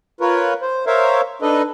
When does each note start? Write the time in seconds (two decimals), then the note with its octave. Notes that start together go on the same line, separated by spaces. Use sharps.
0.21 F4 A#4 B4 C#5
0.62 C5
0.87 A#4 C5 C#5 E5 F5
1.42 D4 D#4 A4 B4 D#5